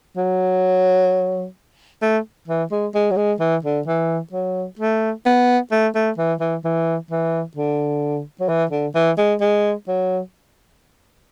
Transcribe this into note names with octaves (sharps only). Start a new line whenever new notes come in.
F#3
A3
E3
G#3
G#3
F#3
G#3
E3
D3
E3
F#3
A3
B3
A3
A3
E3
E3
E3
E3
D3
F#3
E3
D3
E3
G#3
G#3
F#3